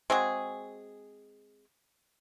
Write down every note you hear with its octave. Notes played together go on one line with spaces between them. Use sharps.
G#3 C4 F#4 G#4